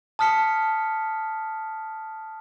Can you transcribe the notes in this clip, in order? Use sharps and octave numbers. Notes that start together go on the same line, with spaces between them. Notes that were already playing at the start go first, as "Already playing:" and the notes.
A5 D#6 F6 B6 C#7